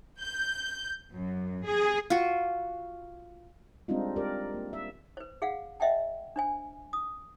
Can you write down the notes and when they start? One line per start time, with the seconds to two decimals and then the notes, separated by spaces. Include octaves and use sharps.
0.19 G6
1.14 F#2
1.66 G#4
2.10 F4 F#4
3.88 G3 G#3 C4 D4 D#4 F4
4.16 G4 A#4 D5
4.54 A#3
4.73 E5
5.17 B4 C5
5.42 G#4 F5 F#5
5.80 C5 D#5 E5 F#5 G5 A5
6.36 D4 C5 G#5
6.93 D#6